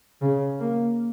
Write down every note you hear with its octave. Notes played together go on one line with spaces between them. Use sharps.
C#3
A#3